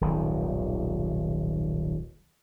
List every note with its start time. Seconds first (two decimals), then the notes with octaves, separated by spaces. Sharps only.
0.01 D#1 B1 G#2 D#3